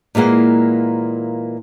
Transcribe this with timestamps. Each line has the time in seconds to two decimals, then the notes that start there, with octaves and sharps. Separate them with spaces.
0.15 A#2 E3 G#3 A#3 F#5